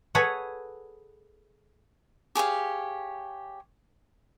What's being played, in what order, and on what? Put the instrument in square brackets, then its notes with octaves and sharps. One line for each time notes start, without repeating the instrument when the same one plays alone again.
[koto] G#4 A4 B4 C#5 F#5
[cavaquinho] G4 G#4 C#5 F5